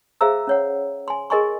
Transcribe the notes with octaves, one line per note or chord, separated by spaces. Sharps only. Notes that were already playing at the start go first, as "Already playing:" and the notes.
G#4 C5 E5 F5 A#5 E6
C#4 C#5 F#5
G#5 C6
G#4 A#4 D#5 G#5 C6 C#6